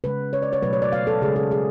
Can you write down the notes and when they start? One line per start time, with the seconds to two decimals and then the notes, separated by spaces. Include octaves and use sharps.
0.04 C#3 G#3 B4
0.33 C#5
0.42 D5
0.53 C#5
0.62 B2 F#3 A3 B4
0.73 C#5
0.82 D5
0.92 F5
1.07 A4
1.22 C#3 G#3 G#4
1.36 A4
1.51 G#4